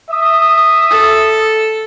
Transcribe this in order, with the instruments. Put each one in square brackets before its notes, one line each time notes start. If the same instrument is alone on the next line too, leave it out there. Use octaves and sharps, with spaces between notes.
[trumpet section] E5 D#6
[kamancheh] A4